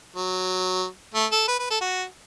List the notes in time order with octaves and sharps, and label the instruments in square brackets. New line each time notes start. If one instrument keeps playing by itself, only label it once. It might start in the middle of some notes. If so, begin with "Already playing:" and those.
[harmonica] F#3
A3
A4
B4
B4
A4
F#4